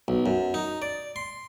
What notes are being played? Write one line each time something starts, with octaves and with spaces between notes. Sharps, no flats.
B1
F#2
D#4
D5
C6